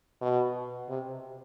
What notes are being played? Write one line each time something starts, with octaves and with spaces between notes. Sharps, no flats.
B2
C3